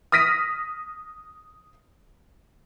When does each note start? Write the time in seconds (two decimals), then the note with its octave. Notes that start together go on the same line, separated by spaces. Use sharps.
0.12 D#6 F6 A#6 B6 D#7